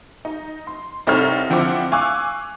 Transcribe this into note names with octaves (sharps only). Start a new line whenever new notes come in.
D#4
C6
C2 C4 D#4 A4 C#5 F6
D3 F3 C4 E4 F#5 D6
F5 G#5 C#6 D6 E6 F#6